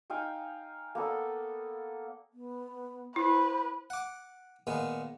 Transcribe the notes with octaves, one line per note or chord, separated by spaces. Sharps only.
D#4 F5 G5 G#5
A#3 B3 A4 D5
B3
E4 B4 C5
F#5 D6
A#2 D#3 G#3 B3